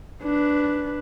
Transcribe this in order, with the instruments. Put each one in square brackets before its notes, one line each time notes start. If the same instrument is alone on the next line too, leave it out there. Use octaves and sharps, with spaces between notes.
[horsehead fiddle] D4 B4